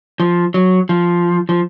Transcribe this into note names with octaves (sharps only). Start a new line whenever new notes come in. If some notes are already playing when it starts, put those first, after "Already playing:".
F3
F#3
F3
F3